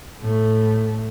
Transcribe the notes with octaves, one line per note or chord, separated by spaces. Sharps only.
A2 A3